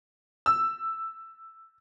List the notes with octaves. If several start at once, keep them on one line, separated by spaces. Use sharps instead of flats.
E6